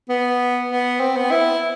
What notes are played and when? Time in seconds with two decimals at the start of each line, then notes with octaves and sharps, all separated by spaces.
0.09 B3
0.70 B3
1.01 C4
1.16 B3
1.31 E4